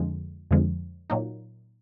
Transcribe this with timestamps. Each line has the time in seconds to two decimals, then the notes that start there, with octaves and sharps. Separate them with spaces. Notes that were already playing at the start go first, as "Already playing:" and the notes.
Already playing: F2 D3 F3 G#3
0.51 F2 D3 F3 G#3
1.10 A#2 F#3 A#3 D#4